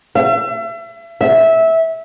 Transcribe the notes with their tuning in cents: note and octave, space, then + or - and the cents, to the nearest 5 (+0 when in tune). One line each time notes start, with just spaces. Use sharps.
E5 +35
E5 -15